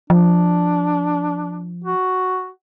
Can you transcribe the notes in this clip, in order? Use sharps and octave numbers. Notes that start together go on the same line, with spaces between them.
F3 D4
F#4